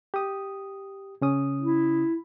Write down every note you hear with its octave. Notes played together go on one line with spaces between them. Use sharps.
G4 D#6
C#3 C#4 D#6
E4